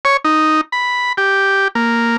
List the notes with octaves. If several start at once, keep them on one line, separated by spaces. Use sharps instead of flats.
C#5
D#4
B5
G4
A#3